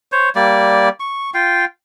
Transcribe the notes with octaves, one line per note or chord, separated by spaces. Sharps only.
C5 C#5
G3 A#3 D5
C#6
F4 F5 G5